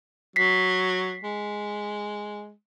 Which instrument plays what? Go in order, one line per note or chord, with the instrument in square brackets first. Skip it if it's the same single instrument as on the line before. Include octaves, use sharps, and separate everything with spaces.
[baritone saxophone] F#3 [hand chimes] B6 C7
[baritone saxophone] G#3